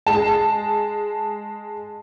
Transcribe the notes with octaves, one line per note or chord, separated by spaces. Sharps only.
G#3 A5